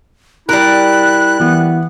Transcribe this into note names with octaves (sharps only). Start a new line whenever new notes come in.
G3 E4 A#4 A#5 F#6
E3 B3